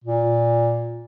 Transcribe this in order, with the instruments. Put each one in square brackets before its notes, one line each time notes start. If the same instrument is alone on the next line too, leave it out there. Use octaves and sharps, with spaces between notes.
[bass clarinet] A#2